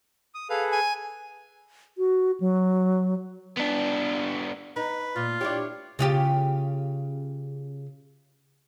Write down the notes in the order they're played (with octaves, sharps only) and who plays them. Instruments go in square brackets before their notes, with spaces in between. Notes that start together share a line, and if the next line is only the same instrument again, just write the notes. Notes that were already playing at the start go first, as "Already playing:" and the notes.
[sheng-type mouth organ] D#6
[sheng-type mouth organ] G#4 A4 B4 [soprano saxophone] F5
[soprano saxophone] G#5
[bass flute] F#4
F#3
[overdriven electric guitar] B3 D4
[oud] D#4 [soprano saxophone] B4
[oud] A#2 [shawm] F4
[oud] D4 E4 G4 [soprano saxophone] C#5
[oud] C#3 F4 G4